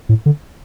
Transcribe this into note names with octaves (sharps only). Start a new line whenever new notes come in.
A2
D3